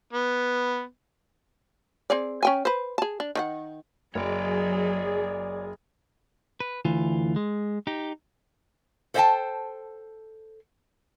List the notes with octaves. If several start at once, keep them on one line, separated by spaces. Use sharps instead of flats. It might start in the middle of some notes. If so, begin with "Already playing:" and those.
B3
C4 G#4 D5
C#4 G5 G#5
B4 C5
G#4 A5
D4
D#3 D#4 F#5
F#1 F#3 G#4 C#5 D5
B4
D2 E3 F4
G#3
D#4 G4
A4 C5 D#5 F#5 G5 A5